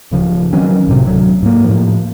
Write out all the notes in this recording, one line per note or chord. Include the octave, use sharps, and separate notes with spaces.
D1 C#3 F3
D#3 F#3 C4 C#4
C2 A2 C3
D1 F#3
G#2 A#3
A2 F3